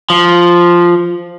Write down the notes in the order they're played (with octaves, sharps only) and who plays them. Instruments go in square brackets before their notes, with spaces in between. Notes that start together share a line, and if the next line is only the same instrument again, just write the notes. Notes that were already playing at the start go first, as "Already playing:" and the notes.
[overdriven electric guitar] F3